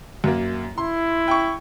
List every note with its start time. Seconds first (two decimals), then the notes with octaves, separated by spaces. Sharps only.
0.24 F#2 A#3
0.78 E4 C6
1.28 G5 C#6